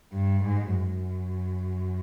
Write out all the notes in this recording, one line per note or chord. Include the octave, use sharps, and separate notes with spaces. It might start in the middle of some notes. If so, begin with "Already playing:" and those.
G2
G#2
F#2